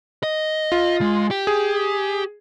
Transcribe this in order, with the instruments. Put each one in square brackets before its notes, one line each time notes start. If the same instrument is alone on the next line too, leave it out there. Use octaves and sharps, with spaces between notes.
[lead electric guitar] D#5
[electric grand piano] F4
[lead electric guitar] G#3
G4
[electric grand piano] G#4